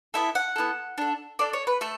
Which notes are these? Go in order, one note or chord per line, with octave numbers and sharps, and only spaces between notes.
B3 E4 A4 E5
F#5
B3 E4 A4
D4 A4
D4 A4 D5
C#5
B4
A3 A4